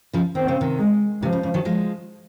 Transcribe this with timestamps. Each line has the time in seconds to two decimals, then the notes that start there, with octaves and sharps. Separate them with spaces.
0.13 C#3 F3
0.35 D#3 C4
0.48 C#3
0.61 C3 D#3
0.79 G#3
1.23 C3 F3
1.33 C#3
1.43 C#3
1.54 D#3 F#3
1.65 F3 G#3